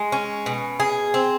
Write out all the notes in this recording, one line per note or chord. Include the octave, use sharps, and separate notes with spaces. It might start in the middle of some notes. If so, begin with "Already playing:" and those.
Already playing: G#3
C#4
B2
G#4
C4